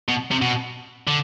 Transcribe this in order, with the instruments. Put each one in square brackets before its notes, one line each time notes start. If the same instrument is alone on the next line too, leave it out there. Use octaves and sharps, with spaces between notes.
[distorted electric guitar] B2
C3
B2
D3